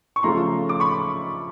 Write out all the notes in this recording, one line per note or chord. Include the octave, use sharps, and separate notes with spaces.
C#6
C#3 F3 A3 A#5 C6
D6
B5 C#6